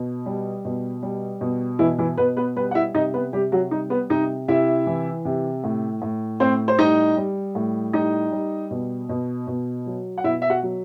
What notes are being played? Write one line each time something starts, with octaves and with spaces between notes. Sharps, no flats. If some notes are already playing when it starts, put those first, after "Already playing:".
Already playing: B2
G3
B2
G3
B2
B2 E3 E4
E3 E4
B2 B3 B4
B3 B4
G3 B3 B4
F#5
E4 E5
C3 D#4 D#5
B3 B4
C3 G3 G4
F#3 F#4
G3 D#4
B3 B4
C3 D#4 D#5
C3 E4 E5
E3
C3
A2
A2
A2 C4 C5
C5
G3 D#4 D#5
G3
A2
G3 D#4 D#5
G3
B2
B2
B2
F#3
F#5
B2 E4 E5
E5
F#4 F#5
F#3